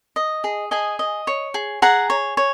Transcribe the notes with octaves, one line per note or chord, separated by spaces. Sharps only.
D#5
G#4
G#4 D#5 G#5
D#5
C#5
G#4
G#4 F#5 A#5
C#5
C#5